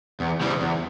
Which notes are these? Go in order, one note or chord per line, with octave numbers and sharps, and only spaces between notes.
E2
C#3 E3 G3
E2